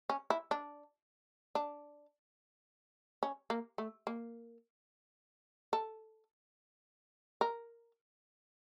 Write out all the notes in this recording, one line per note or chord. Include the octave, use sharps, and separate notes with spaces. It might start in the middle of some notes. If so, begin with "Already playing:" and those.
C#4
E4
D4
D4
C#4
A#3
A3
A#3
A4
A#4